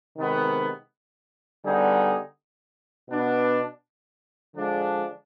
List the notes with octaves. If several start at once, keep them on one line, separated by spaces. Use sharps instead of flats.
C3 D#3 G#3 B3
D3 G3 B3 D#4 G#4
B2 B3 D4
D3 F3 G#3 D4